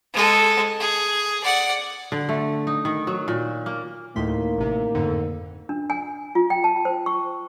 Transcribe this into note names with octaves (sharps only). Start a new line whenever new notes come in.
G#3 A4
G#4
D5 F#5
D3
A3
D#4
D#3
F#3
A#2
A#3
D2 A2 D#3 A#3 D#4 C6 B6
A1 C3
F2 G#2 D3
D4
G#5
F4
G5
A5
C5
C#6